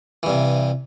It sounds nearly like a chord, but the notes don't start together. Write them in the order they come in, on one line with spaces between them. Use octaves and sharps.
E3 G2 C3